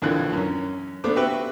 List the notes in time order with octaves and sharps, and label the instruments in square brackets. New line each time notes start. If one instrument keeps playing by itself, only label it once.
[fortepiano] A#1 D#2 A#2 D3 E3 F#6
F#2 C#4
A3 B3 D4 C5 D6
C4 F#4 G4 B4 E5